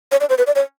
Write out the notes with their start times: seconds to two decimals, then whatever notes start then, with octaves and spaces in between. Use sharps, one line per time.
0.12 C#5
0.21 D5
0.29 C5
0.38 B4
0.47 D5
0.56 C#5